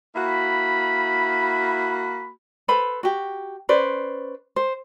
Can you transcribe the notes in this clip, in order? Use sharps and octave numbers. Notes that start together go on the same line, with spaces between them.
A#3 E4 F#4 B5
A4 B4 C5 B5
F#4 G4
C#4 B4 C5 D5
C5